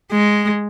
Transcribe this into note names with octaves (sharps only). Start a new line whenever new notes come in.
G#3